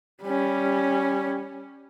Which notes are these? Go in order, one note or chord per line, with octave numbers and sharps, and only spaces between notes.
G3 C#4